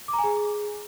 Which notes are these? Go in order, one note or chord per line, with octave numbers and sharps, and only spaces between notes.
D6
A#5
G#5
G#4